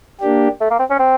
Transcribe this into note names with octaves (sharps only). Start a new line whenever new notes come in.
A#3 D4 G4
A3
A#3
C4
C#4
C4